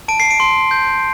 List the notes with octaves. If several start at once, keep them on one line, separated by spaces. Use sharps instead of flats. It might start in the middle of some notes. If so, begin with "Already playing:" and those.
A5 D7
C7
D7
C6
G6